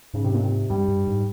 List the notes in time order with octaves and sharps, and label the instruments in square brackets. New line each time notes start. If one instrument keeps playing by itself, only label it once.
[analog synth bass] G#2 [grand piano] C#3
[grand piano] C3
A#2
C3
[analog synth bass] G2 [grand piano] G3
[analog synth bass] G2
G#2